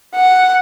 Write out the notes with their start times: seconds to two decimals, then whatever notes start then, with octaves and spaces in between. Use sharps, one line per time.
0.15 F#5